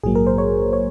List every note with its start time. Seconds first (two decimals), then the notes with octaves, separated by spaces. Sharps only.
0.03 A#1 G#2 F#3 A#3 G#4
0.15 A#4
0.27 C5
0.38 C#5
0.73 C#5